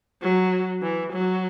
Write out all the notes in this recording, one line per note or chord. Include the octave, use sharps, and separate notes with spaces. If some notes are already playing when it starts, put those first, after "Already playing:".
F#3
E3
F#3